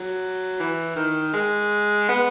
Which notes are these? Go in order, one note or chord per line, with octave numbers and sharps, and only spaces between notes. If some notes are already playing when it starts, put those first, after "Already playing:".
Already playing: F#3
E3
D#3
G#3
B3